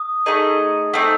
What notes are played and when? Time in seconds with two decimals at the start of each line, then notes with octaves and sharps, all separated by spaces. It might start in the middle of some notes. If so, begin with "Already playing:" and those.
Already playing: D#6
0.26 A3 D#4 G#4 D#5
0.93 A3 C4 D#4 E6